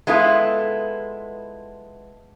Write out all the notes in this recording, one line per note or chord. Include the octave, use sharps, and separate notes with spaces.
G#3 B3 E4 F4 A4